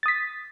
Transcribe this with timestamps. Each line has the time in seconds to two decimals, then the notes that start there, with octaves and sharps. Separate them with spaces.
0.03 A6
0.06 D#6
0.08 B6